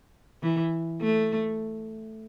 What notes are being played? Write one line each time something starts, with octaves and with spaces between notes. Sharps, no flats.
E3
A3